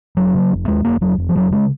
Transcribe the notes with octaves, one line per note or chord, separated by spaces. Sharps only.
F1 F#3
C#3
F1
D#2 G#3
F1 A#3
F1 F#3
F1
F3
F1 F#3
C#3 G#3